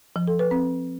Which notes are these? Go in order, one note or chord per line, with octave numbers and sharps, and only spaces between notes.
F3
A4
B4
C4